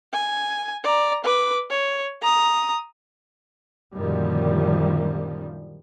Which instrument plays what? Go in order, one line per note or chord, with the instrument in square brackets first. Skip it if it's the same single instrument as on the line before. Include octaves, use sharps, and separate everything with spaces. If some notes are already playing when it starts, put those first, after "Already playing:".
[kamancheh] G#5
D5 A#5
B4 D6
C#5
A#5 D#6
[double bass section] F#2 A#2 D3 D#3 F3 G3